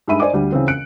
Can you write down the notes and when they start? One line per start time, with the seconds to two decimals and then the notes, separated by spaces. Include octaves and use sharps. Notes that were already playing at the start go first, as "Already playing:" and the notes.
0.08 G2 G#3 D#4 E5 B5 D#7
0.20 C5 D5 D#5 G#5 D6
0.33 D2 G3
0.52 C#3 E3 C4
0.68 F#6 C#7 D7